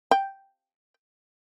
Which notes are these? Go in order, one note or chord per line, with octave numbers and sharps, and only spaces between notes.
G5